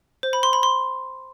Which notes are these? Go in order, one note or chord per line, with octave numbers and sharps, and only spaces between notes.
C5
B5
C6
B5
C6